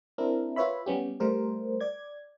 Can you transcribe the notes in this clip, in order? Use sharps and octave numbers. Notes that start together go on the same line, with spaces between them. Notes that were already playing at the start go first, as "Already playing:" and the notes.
C4 D4 E4 A#4
F4 B4 C#5 E5 B5
G3 B3 C#4 G4
G3 A3 A#4 C5
D5 G#6